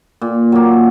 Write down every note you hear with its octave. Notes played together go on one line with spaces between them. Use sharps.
A#2
F#3 A#3